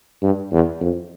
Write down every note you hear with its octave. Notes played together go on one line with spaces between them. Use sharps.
G2
E2
F2